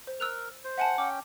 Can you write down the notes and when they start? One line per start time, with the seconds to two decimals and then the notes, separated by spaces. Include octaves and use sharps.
0.07 C5
0.20 A#4 E6 F#6 F7
0.64 C5
0.78 E5 F#5 G#5 A5
0.98 C#4 G5 D6